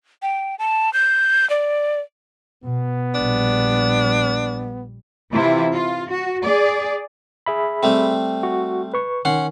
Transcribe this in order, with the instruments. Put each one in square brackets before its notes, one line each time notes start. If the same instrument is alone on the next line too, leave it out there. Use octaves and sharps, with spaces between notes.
[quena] G5
A5
G6
D5
[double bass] B2 [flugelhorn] B3
[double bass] A#1 G3 [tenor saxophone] D4
[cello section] C3 E3 E4 F4
F4
F#4
G#4 D5
[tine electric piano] G#4 E5 B5
[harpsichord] G3 A3 C4
[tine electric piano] F#4
B4 C#6
[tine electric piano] D#3 [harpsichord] C#4 F#5 C6